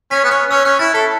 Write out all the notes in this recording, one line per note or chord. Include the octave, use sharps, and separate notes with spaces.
C#4 B6
B3
C#4 F#6
C#4 E6
C#4 F#6
E4 A6
A4 B6